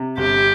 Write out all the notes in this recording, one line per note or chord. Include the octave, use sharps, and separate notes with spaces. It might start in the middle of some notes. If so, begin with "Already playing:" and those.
Already playing: C3
G1 G4